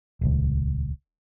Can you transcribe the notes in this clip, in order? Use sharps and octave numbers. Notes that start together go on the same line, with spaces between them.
D#1 C#2